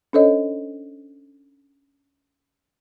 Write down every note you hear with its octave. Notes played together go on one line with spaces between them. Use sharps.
C#4 D4 A4 C5 C#5 D#5